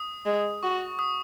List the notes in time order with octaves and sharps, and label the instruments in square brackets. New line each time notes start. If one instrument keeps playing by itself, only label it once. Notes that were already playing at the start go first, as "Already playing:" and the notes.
Already playing: [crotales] D#6
[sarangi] G#3
[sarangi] F#4 [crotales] C#6
[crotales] D#6